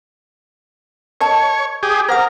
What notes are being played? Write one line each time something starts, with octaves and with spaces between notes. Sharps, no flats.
A#4 C#5 D#5 A5
G4 G#4
A#4 C5 F#5 D#6